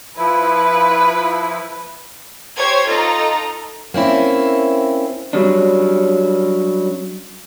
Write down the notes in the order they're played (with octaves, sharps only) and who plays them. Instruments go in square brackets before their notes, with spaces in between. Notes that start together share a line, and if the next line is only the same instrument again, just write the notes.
[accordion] F3 E4 [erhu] B4
[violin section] G4 C5 C#5 G#6
D#4 F4 A4 A#5
[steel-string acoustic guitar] A#3 C4 C#4 E4
[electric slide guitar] F#3 G3 C#4 D4